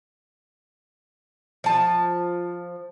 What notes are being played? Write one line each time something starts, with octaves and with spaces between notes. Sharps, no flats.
F3 A5